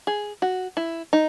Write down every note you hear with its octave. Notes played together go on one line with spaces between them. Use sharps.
G#4
F#4
E4
D#4